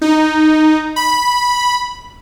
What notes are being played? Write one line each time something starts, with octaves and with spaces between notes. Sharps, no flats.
D#4
B5